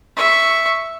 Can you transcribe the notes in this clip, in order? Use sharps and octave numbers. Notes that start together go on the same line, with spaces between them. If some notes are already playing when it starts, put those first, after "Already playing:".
E5 C#6